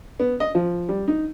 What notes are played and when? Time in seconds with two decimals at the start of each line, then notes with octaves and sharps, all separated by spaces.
0.20 B3
0.40 D#5
0.55 F3
0.89 G3
1.08 D#4